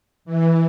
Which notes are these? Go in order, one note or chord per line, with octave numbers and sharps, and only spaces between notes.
E3